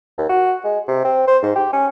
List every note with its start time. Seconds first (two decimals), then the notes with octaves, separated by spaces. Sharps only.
0.18 D#2
0.29 F#4
0.64 G#3
0.88 C3
1.05 C4
1.28 C5
1.43 G#2
1.56 G4
1.73 C#4